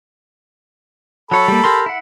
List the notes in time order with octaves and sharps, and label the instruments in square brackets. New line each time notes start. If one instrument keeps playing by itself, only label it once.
[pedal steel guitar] F#3 C#5 [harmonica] A4 B5
[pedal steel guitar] G3 A#3
G4 A#4 C6
E4 F#5